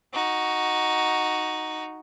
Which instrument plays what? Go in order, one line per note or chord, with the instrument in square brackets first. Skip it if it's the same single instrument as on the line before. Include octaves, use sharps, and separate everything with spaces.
[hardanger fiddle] D#4 F#4